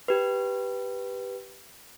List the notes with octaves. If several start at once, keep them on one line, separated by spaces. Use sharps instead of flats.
G4 B4